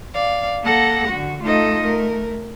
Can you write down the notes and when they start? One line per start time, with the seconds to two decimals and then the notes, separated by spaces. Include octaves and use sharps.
0.13 D5 F5
0.64 A#3 A4 F#5 A#6
1.09 D3 F#4
1.43 A3 D#4 F4 A4 D#5
1.81 A3 A#4